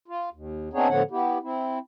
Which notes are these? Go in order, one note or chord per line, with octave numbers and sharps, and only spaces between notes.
F4
D#2
B3 C4 D4 D#4 G#4 C#5
A2 D3 F3 B3 C#5 F#5
B3 E4 G4
C4 E4